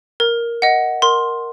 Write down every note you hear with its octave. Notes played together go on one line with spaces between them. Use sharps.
A#4
D#5 F#5
A#4 C6